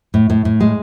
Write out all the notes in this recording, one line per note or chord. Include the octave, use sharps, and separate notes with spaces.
A2
A2
A2
G#3